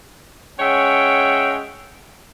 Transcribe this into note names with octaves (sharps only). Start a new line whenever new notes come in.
G#3 C#4 C#5 E5 F#5 G5